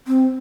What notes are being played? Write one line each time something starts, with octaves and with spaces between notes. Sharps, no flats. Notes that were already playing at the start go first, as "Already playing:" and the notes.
C4